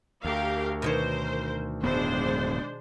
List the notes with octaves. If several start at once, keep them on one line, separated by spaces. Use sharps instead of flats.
D2 G4 A#4 F5
B2 D#3 A#4 C5 C#5
D1 F2 G#3 B3 D4 C5